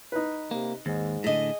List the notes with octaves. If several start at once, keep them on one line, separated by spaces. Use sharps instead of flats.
D#4 B4
C3 A#3
D#2 G#2
A2 D3 G#4 D#5